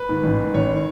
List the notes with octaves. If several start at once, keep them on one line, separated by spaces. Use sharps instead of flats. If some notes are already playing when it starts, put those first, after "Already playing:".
Already playing: B4
G#2 D#3
A1
G#2 D#3
A1 C#5
D#3